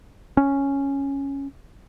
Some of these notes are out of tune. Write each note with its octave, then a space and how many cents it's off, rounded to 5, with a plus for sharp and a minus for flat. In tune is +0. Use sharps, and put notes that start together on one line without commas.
C#4 +0